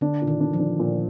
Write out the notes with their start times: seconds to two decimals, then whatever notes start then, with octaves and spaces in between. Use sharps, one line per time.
0.01 D3 D4
0.22 A#2
0.27 D#3
0.40 D4
0.53 F3
0.60 D4
0.80 A#2